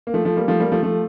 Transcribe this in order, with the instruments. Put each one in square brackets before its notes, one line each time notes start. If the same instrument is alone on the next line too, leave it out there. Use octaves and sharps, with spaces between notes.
[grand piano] A#3
F3 A3
F3 A3
G3 A#3
F3 A3
G3 A#3
F3 A3
F3 A3